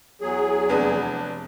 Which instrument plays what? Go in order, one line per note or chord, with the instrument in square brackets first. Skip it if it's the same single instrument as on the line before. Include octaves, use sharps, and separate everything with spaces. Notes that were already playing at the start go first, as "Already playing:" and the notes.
[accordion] E2 F#3 G#4
[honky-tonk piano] F1 B3 D4